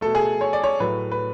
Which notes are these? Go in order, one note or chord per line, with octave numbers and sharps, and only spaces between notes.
B2 A3 A4
G#4
C#5
D5
C#5
A2 F#3 A3 B4
B4